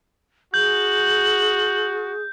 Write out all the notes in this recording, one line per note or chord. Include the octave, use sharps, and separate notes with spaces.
F#4 G#4 G6 F#7